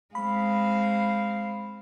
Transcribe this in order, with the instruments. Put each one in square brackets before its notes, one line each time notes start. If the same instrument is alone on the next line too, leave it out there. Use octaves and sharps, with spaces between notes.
[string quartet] G#3 C4 [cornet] F5 [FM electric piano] B5